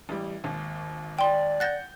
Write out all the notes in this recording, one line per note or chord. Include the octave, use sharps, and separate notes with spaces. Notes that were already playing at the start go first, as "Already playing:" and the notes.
A1 G3
G#1 D#2
D5 G5 C6
F#5 F#6 G6 A6 A#6